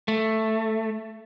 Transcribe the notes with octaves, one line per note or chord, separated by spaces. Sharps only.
A3